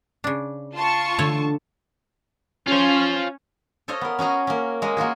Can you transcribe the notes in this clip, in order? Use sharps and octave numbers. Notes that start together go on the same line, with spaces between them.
C#3 D4
F4 A5 C#6
D3 A3 A4 C#5
C#4 F4 C5
A4 C5 C#5 D#5 F5
B3 A#4
C#4 F#4 G#4 A#5
A#3 C#4
G#3 A#3 D#5
A#3 F4 F#4 G#4